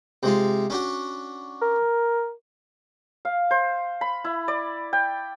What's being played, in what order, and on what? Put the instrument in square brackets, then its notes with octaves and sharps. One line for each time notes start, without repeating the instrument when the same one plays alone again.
[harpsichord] C3 G#3 F4
C#4 D4 F#4
[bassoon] A#4
[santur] F5
C5
B5
E4
D5
G5